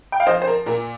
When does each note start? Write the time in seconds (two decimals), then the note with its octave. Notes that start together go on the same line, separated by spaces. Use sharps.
0.12 G5
0.20 F5
0.27 F3 C5 D#5
0.42 C5
0.47 A#4
0.66 A#2 A#4